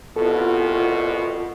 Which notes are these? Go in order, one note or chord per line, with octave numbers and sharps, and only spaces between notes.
C2 B2 F4 A4